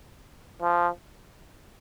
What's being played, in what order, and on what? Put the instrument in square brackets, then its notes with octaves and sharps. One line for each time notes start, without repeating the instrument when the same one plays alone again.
[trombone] F3